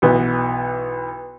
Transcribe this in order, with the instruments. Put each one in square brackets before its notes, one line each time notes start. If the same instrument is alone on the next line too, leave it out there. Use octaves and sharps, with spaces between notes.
[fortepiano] B1 E3 B3